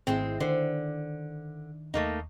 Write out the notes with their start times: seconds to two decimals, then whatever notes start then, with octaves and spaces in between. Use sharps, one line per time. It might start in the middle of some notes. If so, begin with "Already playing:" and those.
0.07 G#1 G#3 C4 E4 A4
0.40 D3 D#3 C5
1.94 D#2 A3 A#3 D#4